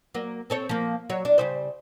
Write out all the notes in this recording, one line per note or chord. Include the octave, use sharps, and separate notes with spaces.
F#3 A#3
C4 A4 C#5
F3 A#3
F#3 C#5
D4
C#3 G3 C5